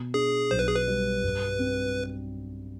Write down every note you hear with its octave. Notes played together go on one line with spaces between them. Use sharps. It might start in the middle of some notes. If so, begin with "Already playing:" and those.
Already playing: B2
D4 G#4
B1 C5
B4
G#4
B4
G3
G2
C4